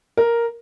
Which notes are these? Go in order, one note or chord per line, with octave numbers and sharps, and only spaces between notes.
A#4